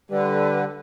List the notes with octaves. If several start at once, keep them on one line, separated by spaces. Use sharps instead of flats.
D3 G3 B4